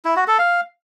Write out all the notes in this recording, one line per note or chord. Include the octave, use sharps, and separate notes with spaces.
E4
F#4
A4
F5